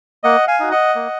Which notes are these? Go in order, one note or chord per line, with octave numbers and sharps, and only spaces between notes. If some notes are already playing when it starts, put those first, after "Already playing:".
A#3 D#5 F#5
F5 G#5
D#4 F#4
D#5 F#5
A#3